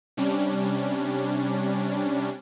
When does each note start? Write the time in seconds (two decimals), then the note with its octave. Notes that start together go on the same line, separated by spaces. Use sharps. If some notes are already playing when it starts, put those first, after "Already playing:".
0.17 C3 G3 C#4 D4